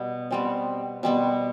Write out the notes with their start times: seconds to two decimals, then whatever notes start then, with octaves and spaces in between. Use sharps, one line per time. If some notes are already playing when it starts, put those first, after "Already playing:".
Already playing: B2 G3 B3
0.31 B2 G3 B3 C4
1.03 B2 G3 B3 C4